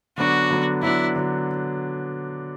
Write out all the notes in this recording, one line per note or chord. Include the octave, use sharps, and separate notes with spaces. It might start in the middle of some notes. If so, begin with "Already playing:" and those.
D3 F#3 B3 D4 F#4
D3 F#3 B3 D4
D3 F#3 B3 D4 E4
D3 F#3